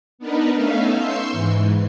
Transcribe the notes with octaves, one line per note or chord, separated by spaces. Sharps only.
B3 D4 D#4 A#4 B4
A3 B3 C#4 D#4 E5 F5
C6 C#6 E6 G6 C7
G#2 E3